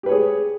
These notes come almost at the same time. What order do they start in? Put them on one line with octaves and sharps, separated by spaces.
G4 B4 C#5 G#4